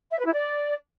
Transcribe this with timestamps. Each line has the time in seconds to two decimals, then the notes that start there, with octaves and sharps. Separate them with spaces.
0.12 E5
0.19 B4
0.26 E4
0.33 D5